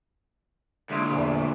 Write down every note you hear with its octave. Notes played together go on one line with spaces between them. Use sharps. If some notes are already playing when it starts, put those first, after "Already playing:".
D2 A#2 G#3 D#4 E4
A#1 E2